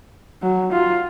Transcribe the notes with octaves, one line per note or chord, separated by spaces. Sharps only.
F#3
F4